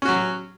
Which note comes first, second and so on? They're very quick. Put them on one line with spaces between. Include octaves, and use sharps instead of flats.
C#4 F#4 F#3